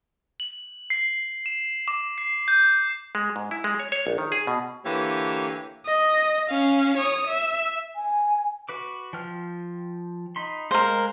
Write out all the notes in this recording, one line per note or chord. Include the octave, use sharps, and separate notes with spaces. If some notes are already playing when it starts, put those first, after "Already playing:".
F#7
C7
E7
D6
C7
G6
G#3
G#2
E4
G#3
C#5
C#5
A#1
D#3
G#4
B2
D3 E3 A#3 G4 C#5
D#5
C#4 F5
C#5 D#6
E5
G#5
F#4 B4 D6
F3 G5 F6
D#4 B5 C6
G#3 A#4 C5 F5